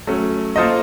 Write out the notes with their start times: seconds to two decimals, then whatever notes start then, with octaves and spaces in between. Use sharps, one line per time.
0.07 F#3 A3 C#4
0.56 A#3 F4 A4 C5 D#5